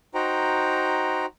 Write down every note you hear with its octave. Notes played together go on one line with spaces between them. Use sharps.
D#4 F#4 C5 G5 A#5